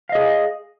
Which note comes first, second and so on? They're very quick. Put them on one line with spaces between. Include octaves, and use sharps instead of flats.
F5 D#5 G#4